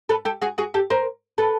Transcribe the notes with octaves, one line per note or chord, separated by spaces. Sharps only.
A4 B4
G4 A4
F#4 G#4
F#4 G#4
G4 A4
A#4 C5
A4 B4